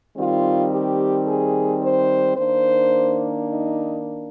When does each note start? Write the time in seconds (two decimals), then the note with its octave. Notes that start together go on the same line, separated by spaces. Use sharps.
0.17 D#3 G3 C4 F4
0.72 G4
1.27 G#4
1.82 C5
2.36 D#3 A#3 D4 C5
3.47 D#4